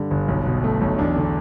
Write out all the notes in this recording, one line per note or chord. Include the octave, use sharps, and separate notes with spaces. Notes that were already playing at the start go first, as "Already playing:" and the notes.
Already playing: G2 D3 G3 G4
G1
B1
B2
A3
B1
E2 D4
D3